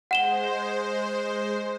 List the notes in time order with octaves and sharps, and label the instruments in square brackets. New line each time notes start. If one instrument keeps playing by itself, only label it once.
[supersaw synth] G#3 C5 [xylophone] F#5 E7 G7